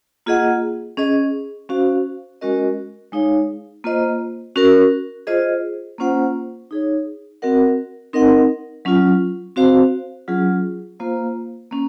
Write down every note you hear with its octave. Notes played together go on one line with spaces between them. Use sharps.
A#3 F4 G#4 D#5 F#5
C#4 G#4 D#5
C#4 F#4 C5 F5
G#3 C#4 F#4 A#4 D#5
G#3 D#4 G#4 C#5 F5
A#3 F4 C5 D#5
C#4 F#4 A#4
F4 G#4 C5 D#5
A#3 C#4 F4 C5 F#5
D#4 G#4 C#5
C4 F#4 A#4 D#5 F#5
C4 D#4 A#4 D#5 F#5
F#3 C#4 F4
C4 F#4 C5 F5
F#3 C#4 F4 G#4
A#3 F4 C5 F5
A#3 C#4